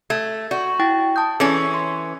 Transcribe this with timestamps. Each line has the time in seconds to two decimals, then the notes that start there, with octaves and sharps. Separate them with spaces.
0.10 A3 G#6
0.51 F#4 D5
0.79 E4 G5 A6
1.16 A5 D#6 G6
1.40 E3 C#4 G#4 A4
1.74 C6